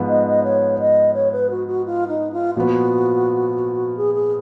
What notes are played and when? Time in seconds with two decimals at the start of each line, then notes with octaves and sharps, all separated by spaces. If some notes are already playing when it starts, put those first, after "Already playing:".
Already playing: G#2 F3 B3
0.08 D#5
0.27 D#5
0.44 C#5
0.79 D#5
1.14 C#5
1.32 B4
1.50 F#4
1.67 F#4
1.86 F4
2.08 D#4
2.32 F4
2.55 A#2 F3 B3 F#4
3.97 G#4
4.14 G#4